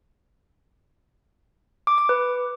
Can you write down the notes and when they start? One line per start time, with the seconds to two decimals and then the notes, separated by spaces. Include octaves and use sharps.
1.87 D6
1.98 D6
2.09 B4